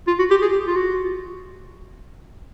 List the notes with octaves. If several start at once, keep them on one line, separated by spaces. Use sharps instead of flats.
F4
F#4
G4
G#4
G4
F4
F#4